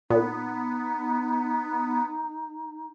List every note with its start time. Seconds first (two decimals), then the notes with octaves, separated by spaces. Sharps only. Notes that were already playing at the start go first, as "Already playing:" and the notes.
0.10 A#2 B3 D#4